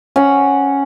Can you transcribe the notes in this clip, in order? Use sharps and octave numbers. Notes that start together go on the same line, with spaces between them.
C#4 F#5